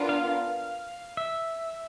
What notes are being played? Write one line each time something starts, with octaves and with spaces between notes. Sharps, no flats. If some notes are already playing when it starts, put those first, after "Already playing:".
Already playing: B3 D4 F4 A#4
F5
E5